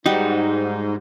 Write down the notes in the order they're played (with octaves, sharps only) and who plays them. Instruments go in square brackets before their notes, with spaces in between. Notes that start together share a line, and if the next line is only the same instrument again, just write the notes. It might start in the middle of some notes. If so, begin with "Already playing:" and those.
[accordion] G#2 [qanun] G3 F#4 [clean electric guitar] D#4